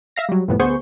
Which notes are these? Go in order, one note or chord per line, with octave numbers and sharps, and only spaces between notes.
E5 F5 A#6
F#3 G3
C2 F2 A2 B3
D2 B3 G#4 C5 C#6 G6